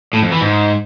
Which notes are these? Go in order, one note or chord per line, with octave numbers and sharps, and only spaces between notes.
A2
F2
E3
G#2